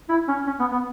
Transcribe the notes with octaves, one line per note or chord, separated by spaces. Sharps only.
E4
C#4
C#4
B3
B3